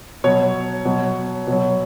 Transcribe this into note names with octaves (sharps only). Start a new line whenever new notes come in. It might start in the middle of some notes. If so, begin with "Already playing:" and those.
B2 F#3 C#5
B2 F#3
B2 F#3